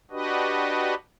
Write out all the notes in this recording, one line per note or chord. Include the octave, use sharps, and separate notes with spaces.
D4 F#4 G4 B4 D#5